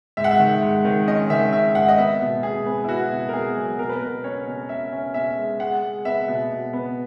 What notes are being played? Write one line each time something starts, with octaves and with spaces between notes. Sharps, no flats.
G#2 E5
F#5
E5
D#3
G#2
D#3
C#4 D#5
D#3 E5
C#4 E5
G#2 F#5
D#5
B3 E5
B2
B2 G#4
B3
E4
B3 F#4
B2
A#4
B2 G#4
F#3
B2 A#4
B4
B2 A#4
C#4 C#5
B2
C#4 E5
C#4
B2 E5
G#3
G#3 F#5
G#3
B3 E5
B2
B2
B3